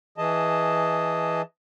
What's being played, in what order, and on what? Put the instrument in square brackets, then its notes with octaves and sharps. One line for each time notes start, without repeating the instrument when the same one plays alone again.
[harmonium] E3 G#4 D#5 A5